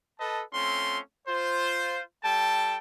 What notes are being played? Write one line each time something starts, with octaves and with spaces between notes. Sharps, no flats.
A4 B4 D#5 A5
A3 C4 C#4 F4 C6
F4 C5
G3 A4 G5 A5